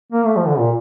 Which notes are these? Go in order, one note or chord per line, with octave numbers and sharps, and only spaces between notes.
A#3
A3
F3
D3
A#2